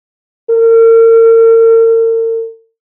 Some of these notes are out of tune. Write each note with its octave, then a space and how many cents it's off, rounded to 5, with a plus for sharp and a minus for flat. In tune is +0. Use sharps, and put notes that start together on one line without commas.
A#4 -40